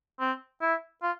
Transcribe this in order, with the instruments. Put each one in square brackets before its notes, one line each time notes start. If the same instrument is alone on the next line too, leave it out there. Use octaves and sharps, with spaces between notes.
[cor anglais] C4
E4
F4